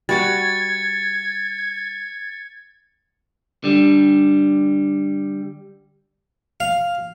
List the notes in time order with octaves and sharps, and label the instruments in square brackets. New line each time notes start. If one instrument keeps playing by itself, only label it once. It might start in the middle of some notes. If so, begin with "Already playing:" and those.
[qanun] G3 F#4 D6 [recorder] G#6 [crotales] A6 C#7
[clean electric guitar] D3 G3
[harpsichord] F5